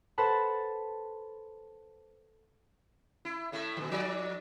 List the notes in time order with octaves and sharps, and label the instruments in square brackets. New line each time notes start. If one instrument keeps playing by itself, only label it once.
[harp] A4 B4 C5 F#5 A5 B5
[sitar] E4
A2 A3 E4
A#2 D#3 E3
F3 D#4 D5